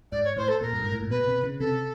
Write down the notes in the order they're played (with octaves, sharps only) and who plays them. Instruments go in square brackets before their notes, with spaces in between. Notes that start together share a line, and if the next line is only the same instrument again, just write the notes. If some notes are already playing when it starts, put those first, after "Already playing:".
[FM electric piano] G#2 [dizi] D5
[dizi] C#5
[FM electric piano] A2 [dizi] C5
[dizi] A4
[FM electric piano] A#2 [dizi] A#4
[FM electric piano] G2
G#2
A2
A#2
[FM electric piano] B2 [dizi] B4
[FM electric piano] C3
C#3
[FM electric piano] C3 [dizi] A4